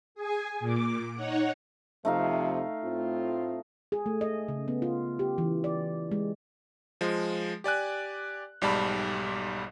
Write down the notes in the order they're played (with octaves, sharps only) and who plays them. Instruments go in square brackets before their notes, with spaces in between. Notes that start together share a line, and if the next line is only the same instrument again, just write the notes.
[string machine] G#4 G#5
A#2 D6
D#4 C#5 F#5
[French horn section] F2 C3 F3 [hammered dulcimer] A3 D#4 F5
[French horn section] A2 C4 F4
[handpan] G#4
A3
D#5
C#3
B3
F4
G4
E3
D5
G#3
[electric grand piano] F3 G#3
G4 D5 G#5 F#6
B1 G#2 G3 D5 A5 B5